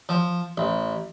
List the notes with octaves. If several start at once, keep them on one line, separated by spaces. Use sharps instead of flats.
F3
A1